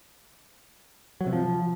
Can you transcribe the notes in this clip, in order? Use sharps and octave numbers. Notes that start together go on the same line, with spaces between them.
F#3
C3
F3